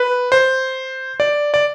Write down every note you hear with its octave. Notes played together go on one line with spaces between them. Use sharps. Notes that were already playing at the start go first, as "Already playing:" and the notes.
Already playing: B4
C5
D5
D5